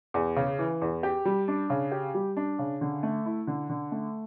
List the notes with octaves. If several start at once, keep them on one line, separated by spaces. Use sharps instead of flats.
E2
C#3
E3
E2
G4
G3
D4
C#3
G4
G3
D4
C#3
D3
A3
E4
D3
D3
A3